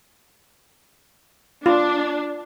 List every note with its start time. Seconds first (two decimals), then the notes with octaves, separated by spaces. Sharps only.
1.66 D4 F4